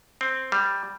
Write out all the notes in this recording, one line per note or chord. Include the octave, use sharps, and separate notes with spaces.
C4
G3